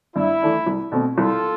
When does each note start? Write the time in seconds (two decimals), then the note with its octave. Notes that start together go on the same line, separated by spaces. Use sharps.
0.16 G2 E4
0.42 E3 A3 D4
0.66 C2
0.92 B2 A3 C4
1.16 C2 F4 A4